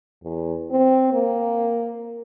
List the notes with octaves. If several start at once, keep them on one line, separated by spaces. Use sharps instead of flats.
E2
C4
A#3